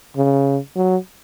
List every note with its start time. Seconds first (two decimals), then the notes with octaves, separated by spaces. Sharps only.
0.16 C#3
0.76 F#3